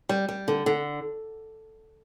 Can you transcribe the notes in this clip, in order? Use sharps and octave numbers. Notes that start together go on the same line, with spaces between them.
G3
G3
D3
D3